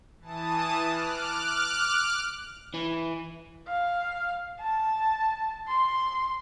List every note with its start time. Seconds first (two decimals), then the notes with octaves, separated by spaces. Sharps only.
0.20 E3 A5 D#6
0.86 D6 F6 F#6
2.74 E3
3.68 F5
4.60 A5
5.68 C6